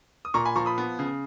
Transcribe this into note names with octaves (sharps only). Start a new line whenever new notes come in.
D#6
A#2 A#5 C#6
G#5 B5
F3 A#5 C#6
B5 D#6
B3
C#3